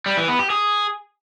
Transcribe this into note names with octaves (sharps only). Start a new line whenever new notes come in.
G3
E3
B3
G4
G#4